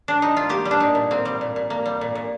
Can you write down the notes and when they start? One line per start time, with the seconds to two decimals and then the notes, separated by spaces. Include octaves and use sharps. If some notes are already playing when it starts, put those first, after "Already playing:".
Already playing: C4
0.08 D4
0.22 D#4
0.37 F4
0.49 A#3 G4
0.65 G3
0.71 D4
0.80 A#2 D#4
0.95 A#2
1.11 A#3 C4
1.25 G3
1.41 A#2
1.56 A#2
1.70 A#3
1.86 G3
2.01 A#2
2.15 A#2